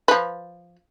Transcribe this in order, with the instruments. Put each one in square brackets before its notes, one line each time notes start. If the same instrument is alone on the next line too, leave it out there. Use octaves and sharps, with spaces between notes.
[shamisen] F3 B4